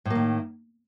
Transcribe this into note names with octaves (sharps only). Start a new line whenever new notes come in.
A2 D#3 A#3